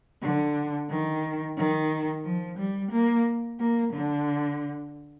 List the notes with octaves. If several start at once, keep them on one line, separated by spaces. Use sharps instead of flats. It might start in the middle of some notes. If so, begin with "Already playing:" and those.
D3
D#3
D#3
F3
G3
A#3
A#3
D3